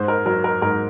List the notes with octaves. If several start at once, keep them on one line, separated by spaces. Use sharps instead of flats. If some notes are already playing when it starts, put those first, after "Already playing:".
Already playing: G#2 C5
A#4
F#3 A#4
A#4
G#2 A#4